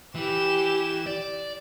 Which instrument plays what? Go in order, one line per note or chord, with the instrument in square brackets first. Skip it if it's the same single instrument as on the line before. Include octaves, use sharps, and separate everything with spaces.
[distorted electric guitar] E3 [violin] G4 E7
[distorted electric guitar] D5